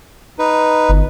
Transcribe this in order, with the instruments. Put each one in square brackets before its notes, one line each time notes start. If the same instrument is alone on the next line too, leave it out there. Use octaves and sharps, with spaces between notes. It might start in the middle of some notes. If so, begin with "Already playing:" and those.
[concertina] D#4 B4
[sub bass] G1